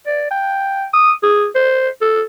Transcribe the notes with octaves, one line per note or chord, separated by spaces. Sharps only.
D5
G5
D#6
G#4
C5
A4